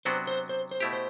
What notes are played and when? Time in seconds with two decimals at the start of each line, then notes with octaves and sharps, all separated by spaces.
0.05 C3 F#3 B3 D4 F#4 C5
0.27 C5
0.49 C5
0.71 C5
0.80 B2 A3 E4 G4
0.93 C5